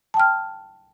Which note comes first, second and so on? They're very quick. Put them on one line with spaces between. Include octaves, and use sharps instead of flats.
A5 G5 F6